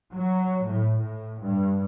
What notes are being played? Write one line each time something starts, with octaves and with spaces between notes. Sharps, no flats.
F#3
A2
A2
G2